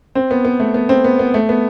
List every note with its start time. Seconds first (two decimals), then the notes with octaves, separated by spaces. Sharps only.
0.15 C4
0.31 B3
0.45 B3
0.60 A3
0.74 B3
0.89 C4
1.04 B3
1.19 B3
1.34 A3
1.49 B3